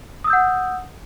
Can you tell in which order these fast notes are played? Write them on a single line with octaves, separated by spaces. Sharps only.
D#6 E6 G6 F#5